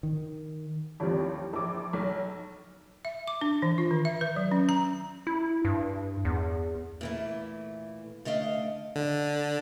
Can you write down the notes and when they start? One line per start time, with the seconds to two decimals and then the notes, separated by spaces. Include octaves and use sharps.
0.03 D#3
1.00 A1 D#2 C3 F3 G3
1.53 A#1 D6
1.93 B1
3.05 E5
3.28 D6
3.41 D4
3.62 E3
3.78 F4
3.91 D#3
4.05 E5
4.21 B4
4.36 F#3
4.52 C#4
4.69 A#5
5.27 E4
5.65 G2
6.25 E2
7.01 A#2 E3 A3
8.25 D3 A3 D#5 F5
8.96 D3